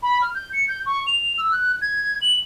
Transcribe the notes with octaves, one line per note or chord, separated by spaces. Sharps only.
B5
F6
G6
C#7
G6
C#6
F7
E6
F#6
G#6
F#7